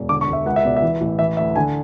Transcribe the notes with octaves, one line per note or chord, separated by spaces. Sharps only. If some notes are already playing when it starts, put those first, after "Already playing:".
Already playing: E1
D3 D6
C#6
E1
E5
C#2 F#5
E5
B2 D5
E5
E3
A1
E3 E5
D2 E5
D3 G#5